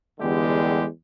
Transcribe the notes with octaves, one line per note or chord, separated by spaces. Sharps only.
G1 E2 D3 G3 G#3 G4